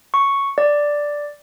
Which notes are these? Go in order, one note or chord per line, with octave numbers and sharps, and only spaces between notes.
C#6
D5